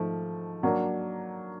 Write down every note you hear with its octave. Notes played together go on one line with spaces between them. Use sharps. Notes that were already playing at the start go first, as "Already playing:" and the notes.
Already playing: G#2 F3 A3
F#3 A#3 D4